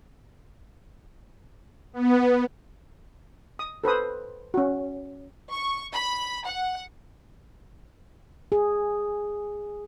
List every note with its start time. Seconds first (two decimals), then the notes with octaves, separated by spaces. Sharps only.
1.93 B3
3.59 D#6
3.84 A4 B4 C5 D#6
4.54 C#4 F#4
5.51 C#6
5.93 B5
6.45 F#5
8.52 G#4